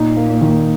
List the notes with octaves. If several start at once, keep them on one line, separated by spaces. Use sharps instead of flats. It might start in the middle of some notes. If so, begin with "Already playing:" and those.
Already playing: A#2 D#4
A#3
D#3